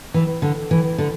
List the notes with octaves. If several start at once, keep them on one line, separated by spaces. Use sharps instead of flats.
E3
D3
E3
D3